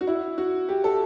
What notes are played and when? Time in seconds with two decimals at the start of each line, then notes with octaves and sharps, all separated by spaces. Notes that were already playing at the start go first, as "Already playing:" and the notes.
0.01 F#4
0.07 E4
0.38 F#4
0.69 G4
0.84 A4